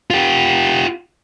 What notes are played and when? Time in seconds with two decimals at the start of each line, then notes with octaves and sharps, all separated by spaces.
0.10 F4 G4